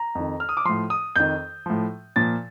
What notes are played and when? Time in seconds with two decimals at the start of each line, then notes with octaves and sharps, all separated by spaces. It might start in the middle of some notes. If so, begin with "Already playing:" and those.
Already playing: A#5
0.15 F2 D#3
0.40 F6
0.49 D#6
0.57 D6
0.65 A2 F3 C6
0.90 D#6
1.16 F2 D#3 G6
1.66 A2 F3
2.16 A#2 F3 A6